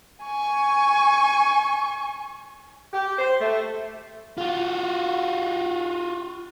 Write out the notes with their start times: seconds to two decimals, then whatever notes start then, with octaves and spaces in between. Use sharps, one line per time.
0.23 G#5 C#6
2.92 G4
3.19 C5
3.40 A3
4.38 F4 F#4